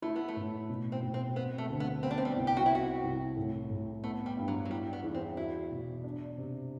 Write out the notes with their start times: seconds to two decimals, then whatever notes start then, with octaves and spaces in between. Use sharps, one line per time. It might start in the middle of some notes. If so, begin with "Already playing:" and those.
0.02 A3 E4
0.16 B3
0.28 A3
0.36 A2
0.69 B2
0.92 C4
1.03 B2
1.14 C4
1.36 B3 C4
1.58 A3
1.70 D2
1.80 B3
2.03 B3 C4
2.11 D4
2.18 C4
2.25 G3
2.36 C2
2.47 G4
2.57 F#4
2.66 E4
2.70 C4 F#4
3.03 C2
3.37 A2
3.70 A2
4.03 A3 B3
4.26 G3
4.37 G2
4.48 F#3
4.65 F#3
4.70 G3 E4
4.93 B3
5.04 E2
5.15 C4
5.37 E4 F#4
5.71 B2
6.04 D4
6.38 C3